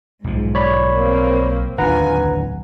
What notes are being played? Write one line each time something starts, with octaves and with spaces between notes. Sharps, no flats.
B1 G#2 F3
C#5 D5 B5
A#3 C4
D1 D#2 D4 F4 B4 F#5 G#5 A#5
B1